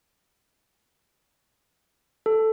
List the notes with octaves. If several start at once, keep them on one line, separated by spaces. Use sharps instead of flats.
A4